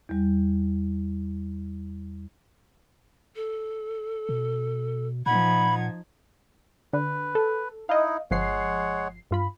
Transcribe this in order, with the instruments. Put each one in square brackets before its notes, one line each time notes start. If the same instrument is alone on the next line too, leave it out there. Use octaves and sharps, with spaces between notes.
[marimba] E2 G3
[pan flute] A4
[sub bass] B2
[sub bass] A#2 [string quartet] F3 D#4 G#6 [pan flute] F#5 [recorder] B5
[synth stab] D3 [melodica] B4
[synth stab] A4
[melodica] D#4 E4 [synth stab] D#5 F5
[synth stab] G1 F3 C7 [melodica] G#3 C#5 F#5
[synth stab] G2 F4 B5